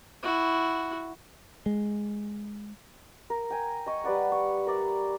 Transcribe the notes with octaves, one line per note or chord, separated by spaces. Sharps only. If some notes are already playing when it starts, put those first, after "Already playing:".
E4 F#4
G#3
A#4
G5 G#5
D#5 C#6
G3 B4 D5 F#5
C#6
A#4 D5 E5